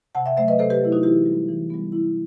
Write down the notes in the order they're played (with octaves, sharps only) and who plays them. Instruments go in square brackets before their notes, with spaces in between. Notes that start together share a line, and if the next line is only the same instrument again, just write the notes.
[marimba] C3 F#5 A5
E5 G5
F#3 A3 C5 E5
B4 D#5
C3 A4 C5
G4 B4
F#3 A3 E4
D#4 F#4
E3 E4 G4
G3 B3
E3
G3 B3
C3 E4